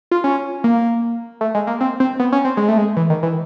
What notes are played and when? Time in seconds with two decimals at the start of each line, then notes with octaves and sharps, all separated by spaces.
0.11 F4
0.24 C#4
0.64 A#3
1.41 A3
1.55 G#3
1.67 A#3
1.80 C4
2.00 C4
2.19 B3
2.32 C#4
2.45 C4
2.57 G#3
2.68 A3
2.78 G#3
2.97 E3
3.10 D#3
3.23 E3